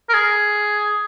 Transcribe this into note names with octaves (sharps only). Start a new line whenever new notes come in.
A#4
G#4